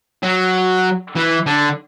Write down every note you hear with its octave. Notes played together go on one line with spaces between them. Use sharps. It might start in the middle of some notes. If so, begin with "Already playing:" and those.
F#3
E3
D3